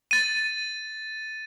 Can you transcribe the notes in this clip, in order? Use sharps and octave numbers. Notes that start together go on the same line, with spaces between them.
A6 D#7